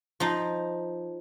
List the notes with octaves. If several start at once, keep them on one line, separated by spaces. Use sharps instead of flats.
F3 D#4